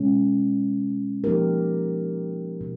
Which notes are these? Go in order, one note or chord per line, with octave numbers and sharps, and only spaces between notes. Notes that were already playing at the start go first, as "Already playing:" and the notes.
Already playing: B2 G#3 C#4
F3 A#3 D#4 G4 A#4
B2